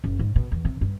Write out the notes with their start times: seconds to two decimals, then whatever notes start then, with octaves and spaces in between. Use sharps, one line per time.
0.04 F#1
0.19 G#2
0.36 B2
0.52 E2
0.65 C3
0.81 G2